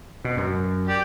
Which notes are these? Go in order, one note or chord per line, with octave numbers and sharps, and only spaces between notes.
B2
F#2
G4 D5